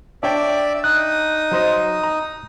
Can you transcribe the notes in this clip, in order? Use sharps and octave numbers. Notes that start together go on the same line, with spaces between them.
D4 C#5 D5 E5 G5
D#4 D#6 F#6
F#3 C5 D#5
A#5